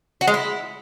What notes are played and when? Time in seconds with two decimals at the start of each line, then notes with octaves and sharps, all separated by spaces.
0.21 F#4
0.27 G#3
0.34 E4